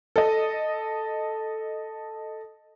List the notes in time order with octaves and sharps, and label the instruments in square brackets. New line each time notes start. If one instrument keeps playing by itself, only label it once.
[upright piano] A4 D#5